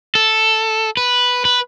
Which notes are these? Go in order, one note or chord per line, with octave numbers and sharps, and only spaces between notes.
A4
B4
B4